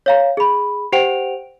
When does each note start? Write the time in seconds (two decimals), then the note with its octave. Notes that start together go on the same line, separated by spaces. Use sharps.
0.06 C#5 F5 A#5
0.37 G#4 B5
0.92 G4 C5 F#5 G5 D7 F7